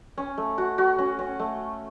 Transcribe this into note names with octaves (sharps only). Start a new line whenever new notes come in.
C#4
A3
F#4
F#4
C#4
C#4
A3